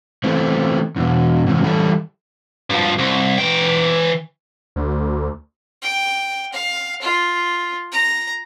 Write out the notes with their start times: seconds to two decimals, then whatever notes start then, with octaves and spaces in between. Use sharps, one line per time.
0.24 E3 A3 C4
0.96 E2 B2
1.46 G#2 C3 E3
1.64 E3 G3 E4 A4
2.70 G2 F3
2.99 C2
3.38 E3 G5
4.76 D2
5.82 G5
6.53 F5
7.02 F4
7.92 A#5